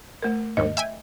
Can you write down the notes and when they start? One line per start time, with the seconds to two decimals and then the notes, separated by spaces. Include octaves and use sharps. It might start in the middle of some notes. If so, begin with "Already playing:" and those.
0.22 A3 A#4
0.57 G#1 D#2 D#5
0.77 E5 G5 G#5